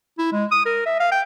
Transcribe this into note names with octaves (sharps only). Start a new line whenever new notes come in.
E4
G#3
D#6
A#4
E5
F5
G5